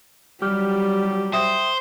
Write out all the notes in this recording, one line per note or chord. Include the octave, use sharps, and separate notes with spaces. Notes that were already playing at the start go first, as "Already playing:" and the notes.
F#3 G3 G4 F6
C5 E5 G5 D#6